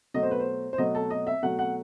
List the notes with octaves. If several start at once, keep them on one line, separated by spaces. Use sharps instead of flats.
B2 F#3 A3 D#5
C5
B4
C5
C5
B2 F#3 A3 D#5
A4
D#5
E5
B2 F#3 A3 F#5
F#5